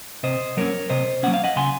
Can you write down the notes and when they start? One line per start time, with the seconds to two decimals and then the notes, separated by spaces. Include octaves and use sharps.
0.23 C3 C5 D#5
0.57 F#3 A#3 C#4 A#4 C#5
0.89 C3 C5 D#5
1.23 F#3 A#3 C#4 F#5
1.34 F5
1.44 D#5 F#5
1.56 C#3 G#5 C6